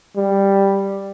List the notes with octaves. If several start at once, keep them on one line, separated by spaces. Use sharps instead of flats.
G3